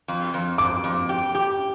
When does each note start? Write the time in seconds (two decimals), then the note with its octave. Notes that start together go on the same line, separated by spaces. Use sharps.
0.08 F2
0.34 F2
0.58 F2 D6
0.84 F2
1.09 G4
1.35 G4